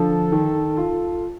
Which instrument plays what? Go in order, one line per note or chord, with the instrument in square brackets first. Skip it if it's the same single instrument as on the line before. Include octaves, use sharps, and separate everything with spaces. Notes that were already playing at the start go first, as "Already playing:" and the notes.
Already playing: [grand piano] D3 F3 [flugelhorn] A4
[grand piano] D#3
F4